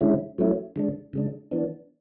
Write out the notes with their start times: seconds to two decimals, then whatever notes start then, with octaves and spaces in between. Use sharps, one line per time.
0.01 D3 G#3 C#4 E4
0.38 F#3 A3 C#4 E4
0.76 D3 G#3 D4
1.13 C#3 G#3 D4
1.51 E3 B3 D4